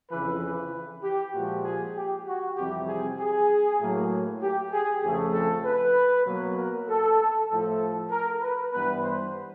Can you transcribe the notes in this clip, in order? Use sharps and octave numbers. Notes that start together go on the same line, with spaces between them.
F2 C#3 E3 B4
B4
G4
A#2 F3 G#3 F#4
G#4
G4
F#4
F2 C3 E3 G3 C4 G4
G#4
G#4
A2 F#3 A#3
G4
G#4
F2 C#3 F3 A3 C4 G#4
A4
B4
B2 F#3 A#3
A#4
A4
A2 F3 A3 A4
A#4
B4
G2 E3 G3 B3 B4
C5